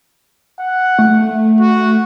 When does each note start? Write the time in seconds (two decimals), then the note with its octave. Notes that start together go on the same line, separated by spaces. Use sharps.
0.60 F#5
0.99 A3
1.60 F#4